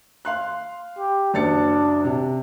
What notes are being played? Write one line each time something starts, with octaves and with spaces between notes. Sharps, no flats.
F5 C6 F#6
G4
F#1 D4 A6 C#7
C3